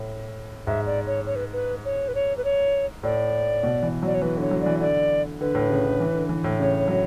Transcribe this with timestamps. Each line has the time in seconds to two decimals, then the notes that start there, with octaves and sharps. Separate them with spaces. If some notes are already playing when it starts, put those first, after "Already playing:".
Already playing: A2
0.67 G#2 E5
0.86 D5
1.07 C#5
1.26 C#5
1.36 B4
1.53 B4
1.85 C#5
2.08 B4
2.15 C#5
2.37 B4
2.44 C#5
3.03 A2 D5
3.63 B2
3.83 E3
4.03 F#3 D5
4.14 C#5
4.22 E3 B4
4.37 D3 C#5
4.51 F#3
4.61 D5
4.66 E3
4.81 D3 D5
5.41 D3 B4
5.55 A2
5.70 C#3
5.84 D3
6.00 E3
6.14 D3
6.29 E3
6.44 A2
6.59 C#3 C#5
6.88 F#3